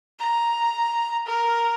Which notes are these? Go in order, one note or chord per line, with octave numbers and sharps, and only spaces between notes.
A#5
A#4